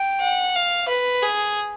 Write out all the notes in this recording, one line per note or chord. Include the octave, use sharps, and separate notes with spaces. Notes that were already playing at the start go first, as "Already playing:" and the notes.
Already playing: G5
F#5
F5
B4
G#4